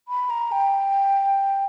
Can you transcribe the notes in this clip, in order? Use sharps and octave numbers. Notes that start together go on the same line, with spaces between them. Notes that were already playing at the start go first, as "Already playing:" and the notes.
B5
A#5
G5